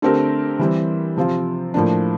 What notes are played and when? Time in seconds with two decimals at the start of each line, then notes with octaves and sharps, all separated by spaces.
0.02 D3 A3 C4 G4 A#4
0.59 E3 G3 C4
1.17 C3 F3 C4 F4
1.74 A2 F3 A#3 D4